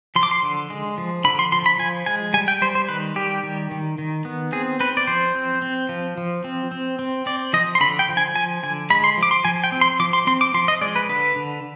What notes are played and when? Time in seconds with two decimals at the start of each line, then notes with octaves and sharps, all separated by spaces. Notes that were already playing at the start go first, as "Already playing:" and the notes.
0.15 F3 C6
0.23 D6
0.31 C6
0.43 D3
0.70 G#3
0.98 F3
1.24 D3 B5
1.39 C6
1.52 F3 C6
1.66 B5
1.79 F3 G#5
2.06 G#3 G#5
2.34 G3 G#5
2.48 G5
2.62 G3 C5
2.75 C5
2.89 D#3 B4
3.16 G3 G4
3.43 D#3
3.71 D#3
3.98 D#3
4.25 B3
4.52 C4 G#4
4.80 C4 B4
4.97 D5
5.07 F3 C5
5.35 C4
5.62 C4
5.89 F3
6.18 F3
6.44 C4
6.72 C4
6.99 C4
7.26 C4 D5
7.53 F3 D#5
7.75 C6
7.80 D3 B5
7.99 G5
8.09 F3
8.17 G#5
8.36 F3 G#5
8.63 D3 G#5
8.90 G#3 B5
9.04 C6
9.17 F3
9.23 D6
9.31 C6
9.45 F3 G#5
9.64 G5
9.72 C4
9.81 C6
10.00 F3 D6
10.13 C6
10.27 C4 C6
10.41 D6
10.54 F3 C6
10.68 D#5
10.81 G#3 D5
10.96 B4
11.09 D3 B4
11.36 D3